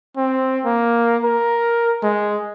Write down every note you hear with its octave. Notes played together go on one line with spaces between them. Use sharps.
C4
A#3
A#4
G#3